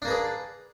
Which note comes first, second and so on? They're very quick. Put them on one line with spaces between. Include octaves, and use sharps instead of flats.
D4 A#3 B4 G#4